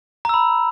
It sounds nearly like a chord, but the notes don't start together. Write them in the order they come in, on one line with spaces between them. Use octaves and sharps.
A#5 E6 B5